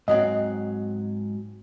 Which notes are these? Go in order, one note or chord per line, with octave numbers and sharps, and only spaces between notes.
G#2 F#3 C4 D#5